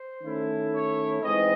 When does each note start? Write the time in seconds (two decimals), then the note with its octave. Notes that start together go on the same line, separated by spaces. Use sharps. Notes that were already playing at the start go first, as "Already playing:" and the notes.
Already playing: C5
0.22 D#3 A3 C#4 E4
0.72 C#5
1.22 G#2 E3 C4 D#5